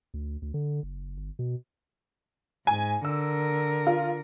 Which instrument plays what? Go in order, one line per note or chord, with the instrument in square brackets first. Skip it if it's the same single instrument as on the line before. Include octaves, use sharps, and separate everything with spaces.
[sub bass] D2
D2
D3
F#1
G1
B2
[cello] G#2 [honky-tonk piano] G#5
[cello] D3 A#4 [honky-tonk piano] E6
[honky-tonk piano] F4